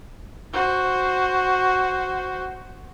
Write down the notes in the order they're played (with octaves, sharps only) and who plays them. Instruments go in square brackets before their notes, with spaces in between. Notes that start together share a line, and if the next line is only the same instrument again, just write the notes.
[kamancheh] F#4 C5